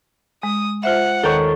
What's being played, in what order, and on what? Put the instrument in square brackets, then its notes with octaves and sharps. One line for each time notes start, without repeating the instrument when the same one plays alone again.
[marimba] G#3 [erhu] D#6
[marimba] F4 C5 E5 [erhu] F#5
[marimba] D#2 D#3 G6 [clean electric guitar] A4 A#4 C#5